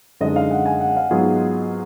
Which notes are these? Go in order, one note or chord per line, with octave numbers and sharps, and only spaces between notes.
F#2 D3 G#3 D#4 D#5
F5
F#5
G#5
F#5
F5
G#2 F#3 B3 F4 G#4